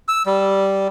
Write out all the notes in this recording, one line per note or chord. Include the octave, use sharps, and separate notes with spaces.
E6
G3